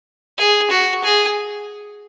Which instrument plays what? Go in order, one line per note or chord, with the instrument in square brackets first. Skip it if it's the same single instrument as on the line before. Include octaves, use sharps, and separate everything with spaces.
[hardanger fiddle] G#4
F#4
G#4